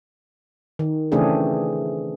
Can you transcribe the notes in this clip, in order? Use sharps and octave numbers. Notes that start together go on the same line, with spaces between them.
D#3
C#3 E3 A3 C4 D4 G#4